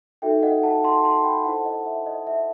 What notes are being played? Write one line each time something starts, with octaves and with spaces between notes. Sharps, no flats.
D#4 F#4 A4 E5 G5
D#5 F#5
F#5 A5
A5 C6
A5 C6
G5 B5
E4 A4 C5 F#5 A5
D#5 F#5
E5
D#5
E5